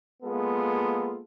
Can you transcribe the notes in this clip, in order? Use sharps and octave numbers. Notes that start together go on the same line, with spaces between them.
G#3 A#3 B3 F4 A4